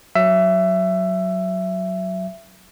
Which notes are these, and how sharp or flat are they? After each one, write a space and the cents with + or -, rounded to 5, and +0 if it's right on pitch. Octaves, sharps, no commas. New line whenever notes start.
F#3 +0 E5 +15